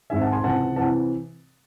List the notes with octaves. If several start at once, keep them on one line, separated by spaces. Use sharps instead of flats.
G#2 D#3 G#3 C4 E5 G#5
F#5 A5
G#5 C6
C#2 C3 E3 C4 F#5 A5
C3 E3 C4 F#5 A5